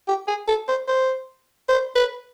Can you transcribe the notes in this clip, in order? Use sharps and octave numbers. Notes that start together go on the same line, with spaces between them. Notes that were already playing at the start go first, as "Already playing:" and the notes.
G4
G#4
A4
C5
C5
C5
B4